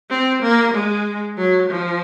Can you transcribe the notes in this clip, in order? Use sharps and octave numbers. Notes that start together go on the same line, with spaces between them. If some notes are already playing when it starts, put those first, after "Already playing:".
C4
A#3
G#3
F#3
F3